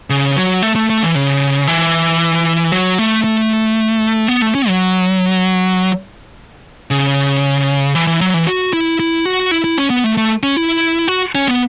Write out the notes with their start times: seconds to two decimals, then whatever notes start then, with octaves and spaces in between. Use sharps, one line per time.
0.10 C#3
0.36 F#3
0.62 A3
0.76 A3
0.90 A3
1.03 E3
1.15 C#3
1.68 E3
2.72 F#3
2.99 A3
3.24 A3
4.28 B3
4.42 A3
4.55 C#4
4.68 F#3
6.91 C#3
7.95 E3
8.07 E3
8.21 F#3
8.34 E3
8.47 F#4
8.73 E4
9.00 E4
9.25 F#4
9.51 E4
9.64 E4
9.78 C#4
9.90 B3
10.04 A3
10.17 A3
10.43 C#4
10.56 E4
11.08 F#4
11.35 C#4
11.48 B3